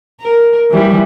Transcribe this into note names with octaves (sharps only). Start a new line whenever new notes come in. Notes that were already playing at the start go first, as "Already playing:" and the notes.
A#4
E3 G3